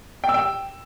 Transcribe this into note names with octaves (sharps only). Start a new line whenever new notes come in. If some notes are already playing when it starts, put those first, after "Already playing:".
G5
E6
G5